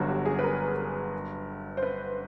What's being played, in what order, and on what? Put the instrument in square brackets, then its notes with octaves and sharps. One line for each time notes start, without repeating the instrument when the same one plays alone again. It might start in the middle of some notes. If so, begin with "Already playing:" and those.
Already playing: [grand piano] G1 G2 D3 F#3 [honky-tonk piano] F#4
[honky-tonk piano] G4
G#4
B4
A#4
C5
B4